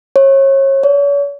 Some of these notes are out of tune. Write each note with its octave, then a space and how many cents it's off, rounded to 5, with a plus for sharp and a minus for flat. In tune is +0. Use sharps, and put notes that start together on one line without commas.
C#5 -30
C#5 +40